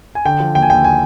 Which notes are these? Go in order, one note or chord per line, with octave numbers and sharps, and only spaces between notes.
G#5
D3 G5
F3
D#2 G5
G#5
D#2 G5
G#5